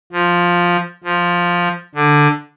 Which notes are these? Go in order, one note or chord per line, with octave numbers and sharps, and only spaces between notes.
F3
F3
D3